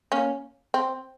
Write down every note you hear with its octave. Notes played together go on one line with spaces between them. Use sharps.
A#3 C#4
C4